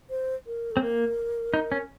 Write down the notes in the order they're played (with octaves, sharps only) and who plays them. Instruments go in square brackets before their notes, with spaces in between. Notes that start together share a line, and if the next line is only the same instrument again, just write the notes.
[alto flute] C5
A#4
A4
[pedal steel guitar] C4
[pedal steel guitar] A#3 [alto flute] A#4
[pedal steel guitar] D#4
C#4